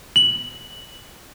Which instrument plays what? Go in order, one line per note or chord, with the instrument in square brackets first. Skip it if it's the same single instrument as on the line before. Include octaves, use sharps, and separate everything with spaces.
[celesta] F#7